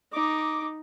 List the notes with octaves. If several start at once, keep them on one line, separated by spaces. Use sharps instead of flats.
D#4 D6